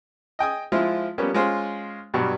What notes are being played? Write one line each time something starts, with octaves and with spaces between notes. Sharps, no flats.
D#5 G5 G#5 D#6
F3 G#3 E4 F4
F3 G3 A#3 B3 C#4
G#3 C#4 F4 G#4 C5
G2 B2 F#3 G3